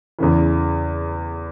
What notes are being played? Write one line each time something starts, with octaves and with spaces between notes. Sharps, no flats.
E2 C#3 E3